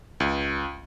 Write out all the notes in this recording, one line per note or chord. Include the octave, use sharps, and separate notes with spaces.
C#2